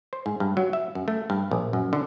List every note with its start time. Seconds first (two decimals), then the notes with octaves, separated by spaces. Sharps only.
0.13 C5
0.26 G#2
0.40 G2
0.57 F#3
0.73 E5
0.95 F#2
1.08 A3
1.30 G2
1.51 A#1
1.73 F#2
1.93 D3